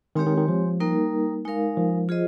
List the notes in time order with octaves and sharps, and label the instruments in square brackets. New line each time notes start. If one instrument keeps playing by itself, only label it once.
[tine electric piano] D#3 [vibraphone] G#3 C4 G4 C#5
[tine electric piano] D#3
D#3
F3
[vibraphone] G3 A#3 D#4 A#4
G#3 D#4 A#4 F5
[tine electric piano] F3
[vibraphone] F4 G#4 C5 D#5